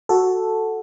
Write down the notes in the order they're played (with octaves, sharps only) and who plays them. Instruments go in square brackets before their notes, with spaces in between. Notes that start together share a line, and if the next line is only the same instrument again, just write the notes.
[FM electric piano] F#4 A4